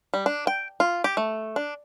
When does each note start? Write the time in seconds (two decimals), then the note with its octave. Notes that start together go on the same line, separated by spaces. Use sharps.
0.14 G3
0.26 D4
0.47 G5
0.80 F4
1.04 G4
1.17 A3
1.56 D4